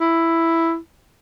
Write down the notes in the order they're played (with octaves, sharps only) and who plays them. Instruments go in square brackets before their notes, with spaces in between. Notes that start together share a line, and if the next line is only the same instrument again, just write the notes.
[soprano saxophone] E4